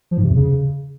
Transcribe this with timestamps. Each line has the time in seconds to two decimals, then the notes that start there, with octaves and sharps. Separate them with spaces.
0.11 F3
0.17 G#2
0.24 C3
0.30 E2
0.36 C#3